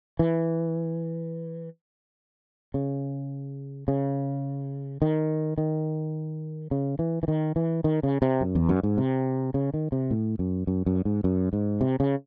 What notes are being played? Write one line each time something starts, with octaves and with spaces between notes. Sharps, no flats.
E3
C#3
C#3
D#3
D#3
C#3
E3
E3
D#3
E3
D#3
C#3
C3
F#2
E2
F#2
G#2
C3
C#3
D#3
C3
A2
F#2
F#2
F#2
G#2
F#2
G#2
C3
C#3